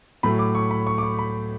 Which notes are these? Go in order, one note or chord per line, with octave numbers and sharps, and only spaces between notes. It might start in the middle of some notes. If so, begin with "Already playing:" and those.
A2 F#3 A3 B5
D6
C#6
B5
C#6
D6
C#6
B5